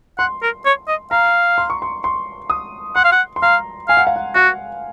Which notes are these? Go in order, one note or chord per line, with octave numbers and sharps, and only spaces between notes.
F#5 C6
A#4
C#5
D#5
F5 A#5
C6
C#6
C6
C6
D#6
F#5 C6
F5
F#5
C6
F5 A#5
F5 G#5
F#5
F5
F#5
F#4 F#5